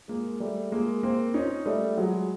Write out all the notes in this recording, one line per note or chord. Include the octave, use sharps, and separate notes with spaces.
G#3 A#3
G3 A3
G#3 A#3
A#3 C4
C#4 D#4
G3 A3
F#3 G#3